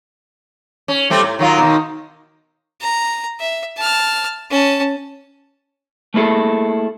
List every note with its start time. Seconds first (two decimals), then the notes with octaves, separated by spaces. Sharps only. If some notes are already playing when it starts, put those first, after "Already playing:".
0.88 C#4
1.10 G3 A3 C4
1.22 A2
1.39 D#3 F#3 F4
1.58 B2 D#3
2.81 A#5
3.40 E5
3.77 A5 F6
4.51 C#4 A5
6.14 A3 A#3 E4 G#4 A4